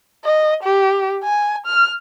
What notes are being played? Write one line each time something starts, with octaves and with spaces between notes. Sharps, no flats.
D#5
G4
G#5
F6